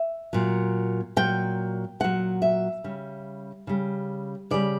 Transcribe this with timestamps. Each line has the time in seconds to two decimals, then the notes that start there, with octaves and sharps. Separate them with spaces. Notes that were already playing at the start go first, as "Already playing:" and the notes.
Already playing: E5
0.33 A#2 F#3
1.16 A#2 F#3 G5
2.00 A#2 F#3 F#5
2.42 E5
2.84 C#3 G3
3.67 C#3 G3
4.51 C#3 G3 D5